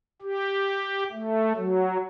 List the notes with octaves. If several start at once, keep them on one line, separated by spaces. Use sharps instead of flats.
G4
A3
F#3